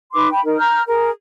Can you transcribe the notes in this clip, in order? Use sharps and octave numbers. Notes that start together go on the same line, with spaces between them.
D#4 B4 C6 D6
G5 B5
D#4 A#4
A#5 F6 G6
G#4 A#4